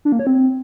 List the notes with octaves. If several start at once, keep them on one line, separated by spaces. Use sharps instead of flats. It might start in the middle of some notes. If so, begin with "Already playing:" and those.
D4
A#3
C#5
C4